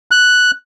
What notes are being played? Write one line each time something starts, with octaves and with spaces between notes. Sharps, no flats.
F#6